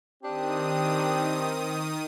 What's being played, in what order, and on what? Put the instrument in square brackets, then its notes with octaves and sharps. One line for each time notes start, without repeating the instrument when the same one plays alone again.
[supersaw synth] D#3 D#6 [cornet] C4 [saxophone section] D4 G4